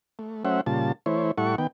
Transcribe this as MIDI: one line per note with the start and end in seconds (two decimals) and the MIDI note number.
0.19 0.44 57
0.45 0.61 54
0.45 0.61 57
0.45 0.61 61
0.45 0.61 72
0.45 0.61 76
0.45 0.61 78
0.66 0.92 46
0.66 0.92 49
0.66 0.92 55
0.66 0.92 65
0.66 0.92 81
1.06 1.31 52
1.06 1.31 57
1.06 1.31 64
1.06 1.31 72
1.06 1.31 73
1.38 1.56 45
1.38 1.56 55
1.38 1.56 64
1.38 1.56 69
1.38 1.56 78
1.38 1.56 85
1.58 1.67 51
1.58 1.67 59
1.58 1.67 79